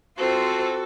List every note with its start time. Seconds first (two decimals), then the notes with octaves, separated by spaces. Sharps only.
0.18 C4 F4 F#4 A4 C5